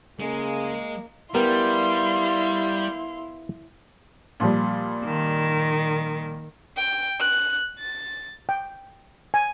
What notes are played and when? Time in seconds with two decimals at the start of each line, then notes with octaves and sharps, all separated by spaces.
0.20 C#3 G#3 A#3
1.34 G3 B3 E4 G4 A#4 F5 C6
4.40 A#2 F3 G3
5.05 D#3
6.77 G5
7.20 F#6
7.79 A6
8.49 G5
9.34 G#5